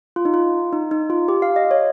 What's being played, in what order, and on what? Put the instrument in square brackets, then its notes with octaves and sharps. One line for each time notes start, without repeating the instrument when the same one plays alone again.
[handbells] F4
D#4
F4
D#4
D#4
F4
G4
F5
D#5
C#5